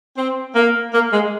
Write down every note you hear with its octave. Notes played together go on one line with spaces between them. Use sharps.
C4
A#3
A#3
G#3